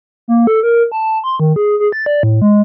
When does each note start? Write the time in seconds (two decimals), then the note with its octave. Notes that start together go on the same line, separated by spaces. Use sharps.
0.28 A#3
0.47 A4
0.63 A#4
0.92 A5
1.24 C6
1.40 D#3
1.56 G#4
1.80 G#4
1.92 A6
2.06 D5
2.23 A2
2.42 G#3